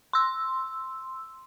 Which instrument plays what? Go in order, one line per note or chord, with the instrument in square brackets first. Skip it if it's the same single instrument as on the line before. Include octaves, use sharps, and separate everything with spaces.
[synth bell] C6 E6